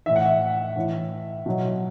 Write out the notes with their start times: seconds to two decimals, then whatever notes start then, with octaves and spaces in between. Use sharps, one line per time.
0.06 A2 E3 E5
0.16 F#5
0.26 E5
0.76 A2 E3
1.46 B2 F#3